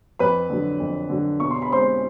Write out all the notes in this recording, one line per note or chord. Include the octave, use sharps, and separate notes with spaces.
F2 B4 B5
D3 F#3
F2
D3 F#3
B2 C#6
C6
B5
G#3 C4 C5 C6